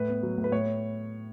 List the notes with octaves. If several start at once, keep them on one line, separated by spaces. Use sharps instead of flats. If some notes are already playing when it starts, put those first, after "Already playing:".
Already playing: A2 B4
B3
F#3
A2
B4
A2 C#5